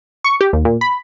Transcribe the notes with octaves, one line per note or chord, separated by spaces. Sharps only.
C#6
G4
D#2
A#2
B5